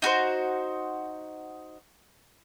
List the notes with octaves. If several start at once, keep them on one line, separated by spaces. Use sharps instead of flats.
D#4 F#4 B4 C5